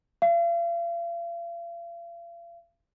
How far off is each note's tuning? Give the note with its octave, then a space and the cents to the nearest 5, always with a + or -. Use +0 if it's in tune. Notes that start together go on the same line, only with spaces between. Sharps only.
F5 -40